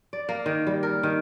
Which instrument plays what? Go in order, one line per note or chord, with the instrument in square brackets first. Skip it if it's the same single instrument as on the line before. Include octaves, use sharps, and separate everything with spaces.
[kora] D5
A#3
D#3
G3
A#4
D#3